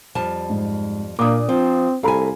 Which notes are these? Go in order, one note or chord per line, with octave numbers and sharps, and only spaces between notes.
F2 G3 A5
G#2
A#2 A#3 D4 D6 D#6
F3 C4
C2 A4 F5 G#5 A#5 B5